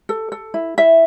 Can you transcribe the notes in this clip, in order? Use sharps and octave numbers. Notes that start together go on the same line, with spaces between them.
A4
A4
E4
E4 E5